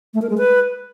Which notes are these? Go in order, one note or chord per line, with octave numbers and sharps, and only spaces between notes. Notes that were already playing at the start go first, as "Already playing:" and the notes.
A3
A#4
G#3
B4